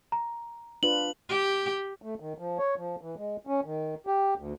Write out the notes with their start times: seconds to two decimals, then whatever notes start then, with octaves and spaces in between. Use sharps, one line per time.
0.12 A#5
0.83 D4 F4 B4 F#7
1.29 G4
2.02 A3
2.20 D#3
2.38 F3
2.58 C#5
2.77 F3
3.01 E3
3.17 G#3
3.47 C#4
3.65 D#3
4.07 G4
4.37 D2